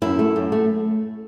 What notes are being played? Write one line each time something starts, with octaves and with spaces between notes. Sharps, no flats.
F#2 E4
A3
F#2
A3